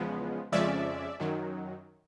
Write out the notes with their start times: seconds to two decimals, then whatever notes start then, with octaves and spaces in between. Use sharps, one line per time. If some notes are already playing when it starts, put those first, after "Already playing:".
Already playing: E2 C#3 F3 G#3 B3
0.52 F2 C#3 F3 G#3 C#4 D5 E5
1.20 F#2 D#3 F#3